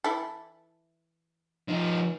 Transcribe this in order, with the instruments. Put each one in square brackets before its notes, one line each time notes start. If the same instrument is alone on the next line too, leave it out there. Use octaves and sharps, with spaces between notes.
[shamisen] E3 E4 A4
[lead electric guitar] F3 D#4